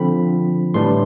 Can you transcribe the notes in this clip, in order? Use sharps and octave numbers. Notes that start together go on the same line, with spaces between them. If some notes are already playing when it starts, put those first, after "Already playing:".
Already playing: D3 F3 C4 B5
A2 E3 G3 D4 C6